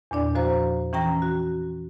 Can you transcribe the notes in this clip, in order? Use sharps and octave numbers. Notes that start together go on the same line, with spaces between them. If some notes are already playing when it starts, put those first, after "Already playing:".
E2 A#2 D4 D5
F3 F#4 C5 A#5
E3 C#4 G5 A#5 A#6
F#4